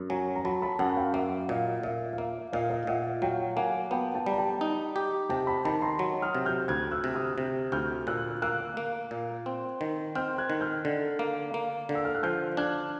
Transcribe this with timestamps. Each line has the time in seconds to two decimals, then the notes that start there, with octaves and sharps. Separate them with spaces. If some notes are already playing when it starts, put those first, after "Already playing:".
Already playing: F#2
0.10 F#3 G#5 A#5
0.35 A#5
0.44 F#3 A5 B5
0.62 A5 B5
0.79 F#2 F#5 G#5
0.96 F5 G5
1.14 A#3 E5 F#5
1.48 A#2 D#5 F5
1.83 A#2 E5
2.13 F5
2.18 A#3 E5
2.53 A#2 D#5 F5
2.70 D#5 F5
2.87 A#2 E5 F#5
3.22 F#3 F5 G5
3.56 A#3 F#5 G#5
3.91 B3 G5 A5
4.15 G5 A5
4.26 G3
4.31 A#5
4.38 G5 A5
4.61 D#4
4.96 G4
5.30 C3 G5 A5
5.47 A5 B5
5.65 D#3 A5 B5
5.82 A#5 C6
5.99 F#3
6.22 D#6 F6
6.35 C3
6.46 F6 G6
6.68 D2 F#6 G#6
6.91 E6 F#6
7.04 C3
7.15 D#6 F6
7.38 C3
7.72 D2 F6 G6
8.07 A#2 E6 F#6
8.42 A#3 E6 F#6
8.77 A#3
9.11 A#2
9.46 C4
9.81 D#3
10.15 C4 F6 G6
10.38 F#6 G#6
10.50 D#3
10.61 F6 G6
10.85 D3
11.19 A#3
11.54 A#3
11.89 D3
11.95 E6
12.05 F6
12.15 F#6
12.23 F3 F6 G6
12.57 D4 F#6 G#6